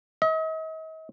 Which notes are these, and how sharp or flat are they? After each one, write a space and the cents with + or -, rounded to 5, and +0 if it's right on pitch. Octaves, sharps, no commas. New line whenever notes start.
D#5 +40